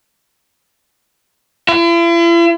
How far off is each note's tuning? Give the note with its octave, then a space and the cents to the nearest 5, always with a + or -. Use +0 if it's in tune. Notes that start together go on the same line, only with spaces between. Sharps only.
E4 +45